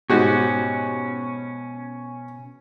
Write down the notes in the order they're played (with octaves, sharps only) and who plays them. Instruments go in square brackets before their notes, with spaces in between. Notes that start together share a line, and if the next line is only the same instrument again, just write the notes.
[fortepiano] G#2 F#4 G4 [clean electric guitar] B2 [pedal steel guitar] C#4